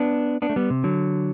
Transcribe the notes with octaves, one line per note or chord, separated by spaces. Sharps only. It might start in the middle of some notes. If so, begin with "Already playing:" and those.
Already playing: B3 D4
B3 D4
A3
G3 B3
C3
D3 F#3